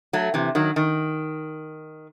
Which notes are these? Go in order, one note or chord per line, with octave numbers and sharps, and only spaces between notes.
F#3 A3
C3 E3
D#3 F#3
D#3